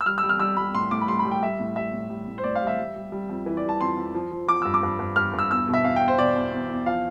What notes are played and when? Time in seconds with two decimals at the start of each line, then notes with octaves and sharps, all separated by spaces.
0.01 E6
0.06 G3 F6
0.18 E6
0.23 G3
0.29 F6
0.40 G3 E6
0.57 G3 B5
0.74 A2 C6
0.91 A2 D6
1.01 B5
1.08 G3 C6
1.19 B5
1.25 G3
1.31 G5
1.42 G3 E5
1.60 A2
1.76 G3 E5
1.93 A2
2.10 G3
2.27 A2
2.38 C5
2.44 A2 D5
2.55 F5
2.62 G3
2.67 E5
2.79 G3
2.96 G3
3.12 G3
3.29 F2
3.46 E3
3.57 D5
3.64 G3 A5
3.80 F2 C6
3.97 F2
4.15 F3
4.31 F3
4.48 F3 D6
4.62 G2 E6
4.74 D6
4.83 G2
4.99 G2
5.16 G2 F6
5.33 G2
5.39 E6
5.51 E2 E6
5.67 B2
5.74 E5
5.84 E2 F5
5.96 E2 G5
6.08 C5
6.18 B2 D5
6.35 E2
6.52 E2
6.70 E2
6.86 F3 F5